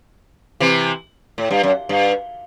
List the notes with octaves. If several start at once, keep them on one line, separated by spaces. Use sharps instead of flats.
C3 E3
A2
G2
F#2
G2